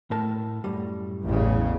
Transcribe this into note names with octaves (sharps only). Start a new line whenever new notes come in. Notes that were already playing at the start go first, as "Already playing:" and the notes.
A2 A#4 A5
F#2 A2 G3
A1 E2 C#3